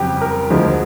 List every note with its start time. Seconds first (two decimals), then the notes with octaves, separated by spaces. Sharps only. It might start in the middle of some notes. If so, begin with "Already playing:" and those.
Already playing: G1 F2 C#3 F#3 G4
0.21 A#4
0.50 D2 D3 F3 G#3